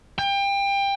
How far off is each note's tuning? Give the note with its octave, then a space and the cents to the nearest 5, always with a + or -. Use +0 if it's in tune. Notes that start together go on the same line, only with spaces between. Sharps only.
G5 +25